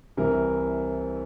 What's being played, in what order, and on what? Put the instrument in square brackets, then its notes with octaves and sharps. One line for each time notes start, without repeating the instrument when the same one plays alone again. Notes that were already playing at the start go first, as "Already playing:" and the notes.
[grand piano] C2 C3 E3 A#4